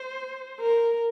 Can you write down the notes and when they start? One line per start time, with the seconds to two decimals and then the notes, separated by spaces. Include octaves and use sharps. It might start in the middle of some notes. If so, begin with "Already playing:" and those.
Already playing: C5
0.60 A#4